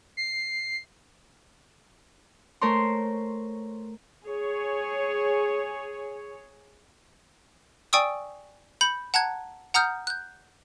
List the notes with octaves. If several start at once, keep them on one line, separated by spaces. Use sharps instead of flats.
C7
A3 A#4 C5 C#5 C6
G#4 C#5
D5 G5 G#5 C#6 D#6 E6
B5 G6 C#7 F#7
F#5 A5 A#5 F#6 G#6
F#5 A#5 D#6 F6 G6
F#6 G6